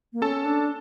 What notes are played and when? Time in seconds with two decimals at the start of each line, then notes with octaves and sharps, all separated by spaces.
0.13 A#3
0.22 C#4 A4 A5
0.45 D4